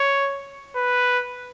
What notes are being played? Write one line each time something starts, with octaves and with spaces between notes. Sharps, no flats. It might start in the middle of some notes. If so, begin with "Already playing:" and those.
Already playing: C#5
B4